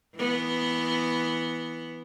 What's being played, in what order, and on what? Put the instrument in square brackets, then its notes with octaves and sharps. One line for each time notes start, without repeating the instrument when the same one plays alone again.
[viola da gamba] E3 B3